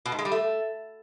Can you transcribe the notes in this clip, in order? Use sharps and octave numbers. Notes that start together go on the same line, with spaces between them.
B2
G#2
G#3
G3
A3